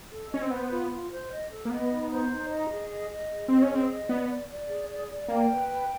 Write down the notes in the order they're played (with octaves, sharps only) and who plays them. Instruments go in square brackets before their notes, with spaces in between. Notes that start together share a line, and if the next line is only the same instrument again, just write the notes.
[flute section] A4
[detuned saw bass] C#4 [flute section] D#5
[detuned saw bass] C4
[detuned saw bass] B3 [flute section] C5
[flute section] F4
F4
C5
D#5
A4
[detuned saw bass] A#3
[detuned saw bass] B3 [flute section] D#5
[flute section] D#4
C5
D#4
D#5
G#4
D#5
D#5
G#4
[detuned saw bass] C4 [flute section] D#5
[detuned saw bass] C#4
[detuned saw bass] C4 [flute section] G#4
[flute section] D#5
[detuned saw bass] B3 [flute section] D5
[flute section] D5
D5
G#4
D5
D5
[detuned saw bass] A#3 [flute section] G5
[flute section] B4
G5